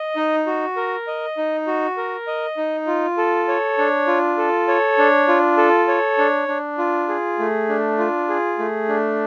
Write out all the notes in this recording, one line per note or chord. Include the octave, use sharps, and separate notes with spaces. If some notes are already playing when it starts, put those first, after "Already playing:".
Already playing: D#5
D#4
F#4
A#4
D#5
D#4
F#4
A#4
D#5
D#4
F4
A4
C#5
D4
F4
A4
C#5
D4
F4
A4
C#5
D4
D4
F4
G#4
A3
D4
F4
G#4
A3
D4